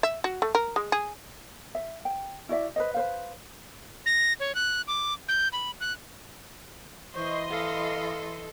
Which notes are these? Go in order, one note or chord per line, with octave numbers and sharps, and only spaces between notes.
E5
F#4
A3
A#4
G#3
G#4
E5
G5
E4 F#4 D5 E5
B4 C5 D#5
B4 C5 F5
A#6
C#5
F#6
D6
G6
B5
F#6
E3 C5 D#5 C6 C#6
A4 F5